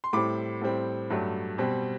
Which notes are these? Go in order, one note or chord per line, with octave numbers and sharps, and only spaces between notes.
C6
A2 G3 C4 B5 D6
A2 G3 C4
G2 F#3 A3
B2 G3 C4